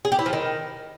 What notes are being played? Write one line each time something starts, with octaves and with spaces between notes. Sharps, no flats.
G#4
G4
E4
F3
D#3